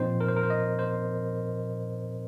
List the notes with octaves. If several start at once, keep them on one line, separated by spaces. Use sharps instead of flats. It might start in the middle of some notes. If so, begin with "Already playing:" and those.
Already playing: A#2 F3 C4 D#4 C5
A#4
C5
A#4
C5
D#5
C5